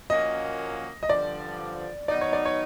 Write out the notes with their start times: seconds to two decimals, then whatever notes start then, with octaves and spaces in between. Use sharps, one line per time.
0.10 A#2 F3 A#3 C#4 F#4 D#5
1.03 D#5
1.09 G2 D3 F3 D5
2.08 D#3 F#3 B3 D#4 D5
2.21 C#5
2.33 D5
2.45 C#5